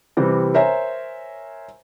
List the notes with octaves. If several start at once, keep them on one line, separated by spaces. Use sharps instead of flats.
C3 E3 G3 C4
A#4 C5 C#5 E5 G#5 A#5